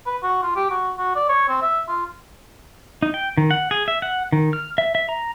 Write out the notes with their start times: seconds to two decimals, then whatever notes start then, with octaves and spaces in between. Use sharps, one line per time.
0.06 B4
0.23 F#4
0.43 F4
0.56 G4
0.70 F#4
0.98 F#4
1.16 D5
1.29 C#5
1.48 C4
1.62 E5
1.88 F4
3.02 D#4
3.14 G5
3.37 D#3
3.51 F#5
3.71 G#4
3.88 E5
4.02 F#5
4.32 D#3
4.53 F6
4.78 E5
4.95 E5
5.09 A#5